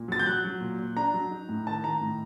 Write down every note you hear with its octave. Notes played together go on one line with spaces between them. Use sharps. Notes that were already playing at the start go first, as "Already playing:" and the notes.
Already playing: A#2
F#3 A6
G6
F#3 F#6
F#3
A#2
A#2
D4 A#5
F#3
D#4
A2
D#3 A5
D#3 A#5
A2